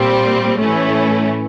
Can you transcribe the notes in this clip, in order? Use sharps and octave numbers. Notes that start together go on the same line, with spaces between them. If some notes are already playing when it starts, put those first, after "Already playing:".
Already playing: A#2 G3 C4
A2 E3 A3 C#4 E4